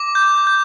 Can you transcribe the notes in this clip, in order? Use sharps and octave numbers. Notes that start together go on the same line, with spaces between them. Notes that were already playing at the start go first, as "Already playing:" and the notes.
Already playing: D6
G6
G6